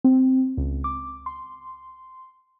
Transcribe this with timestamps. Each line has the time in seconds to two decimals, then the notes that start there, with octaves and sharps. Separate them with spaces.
0.04 C4
0.57 C#2
0.84 D6
1.26 C6